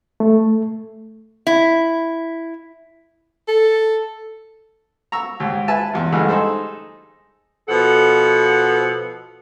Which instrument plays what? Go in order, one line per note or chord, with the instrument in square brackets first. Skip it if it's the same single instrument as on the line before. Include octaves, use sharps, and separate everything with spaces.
[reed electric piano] A3
[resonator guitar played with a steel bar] E4
[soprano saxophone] A4
[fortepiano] A#5 C#6 E6
D#2 G#2
B4 E5 G#5 A5
E2 C3
G2 D3 E3 G#3 A3
D#4 G#4 A4 C5
[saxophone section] B2 F3 A4 F#5